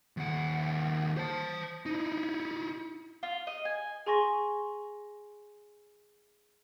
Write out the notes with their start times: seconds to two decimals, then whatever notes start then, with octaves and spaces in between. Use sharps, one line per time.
0.17 D#2 F#5
1.17 C5 A5
1.86 D#4 E4
3.23 F4
3.47 D#5
3.65 G#5
4.06 G#4 G#5 C6 C#6 A#6